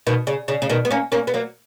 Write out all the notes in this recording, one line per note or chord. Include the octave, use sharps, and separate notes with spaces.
B2 D#3
C#3
C#3
C#3
B2 D#3
B3
A#3 C#4
A#3 C#4
B3
F#3 A#3